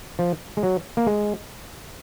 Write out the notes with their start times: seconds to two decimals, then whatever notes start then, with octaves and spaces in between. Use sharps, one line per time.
0.19 F3
0.57 G#3
0.63 F#3
0.97 A#3
1.07 G#3